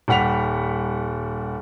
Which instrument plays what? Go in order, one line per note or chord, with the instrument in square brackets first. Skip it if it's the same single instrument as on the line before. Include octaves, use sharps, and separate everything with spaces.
[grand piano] D#1 G3 F#5 B6 F7